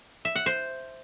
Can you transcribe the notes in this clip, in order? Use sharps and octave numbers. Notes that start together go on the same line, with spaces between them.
E5
F#5
C5